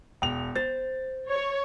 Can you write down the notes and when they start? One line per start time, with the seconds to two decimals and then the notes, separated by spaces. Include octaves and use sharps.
0.22 E1 G5 F7
0.56 C5 A6
1.29 C#5